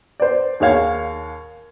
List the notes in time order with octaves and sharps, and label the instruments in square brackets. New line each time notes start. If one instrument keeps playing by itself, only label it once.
[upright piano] C5 D5
D#2 G#4 C#5 F5 G#6